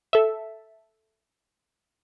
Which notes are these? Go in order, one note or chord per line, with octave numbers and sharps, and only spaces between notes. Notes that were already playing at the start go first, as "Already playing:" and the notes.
A4 E5